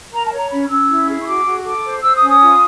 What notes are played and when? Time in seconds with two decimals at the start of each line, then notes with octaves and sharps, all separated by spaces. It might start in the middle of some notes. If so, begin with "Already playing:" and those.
0.12 A#4 A#5
0.25 A5
0.32 C#5
0.37 A#5
0.50 C#4 B5
0.64 F6
0.69 C#4 E6
0.88 E4
1.08 G#4
1.19 C#6
1.26 F#4 D6
1.45 F#4
1.65 A4 D6
1.83 C5
2.02 C5 E6
2.16 D#6
2.21 C#4
2.28 D#6
2.40 F4